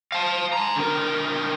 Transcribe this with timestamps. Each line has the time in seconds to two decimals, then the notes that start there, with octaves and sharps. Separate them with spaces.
0.12 F5 A5
0.53 G#5 A#5
0.76 D3 A#4